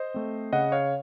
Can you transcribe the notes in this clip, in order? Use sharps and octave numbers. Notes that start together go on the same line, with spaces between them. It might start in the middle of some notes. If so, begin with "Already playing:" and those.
Already playing: C5 D#5
A3 C4
C#3 D#5 F#5
C#5 F5